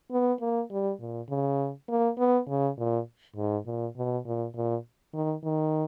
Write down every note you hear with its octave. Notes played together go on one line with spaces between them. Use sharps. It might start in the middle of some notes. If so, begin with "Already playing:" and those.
B3
A#3
G3
A#2
C#3
A#3
B3
C#3
A#2
G#2
A#2
B2
A#2
A#2
D#3
D#3